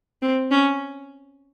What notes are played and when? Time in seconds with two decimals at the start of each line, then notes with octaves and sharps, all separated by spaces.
0.22 C4
0.51 C#4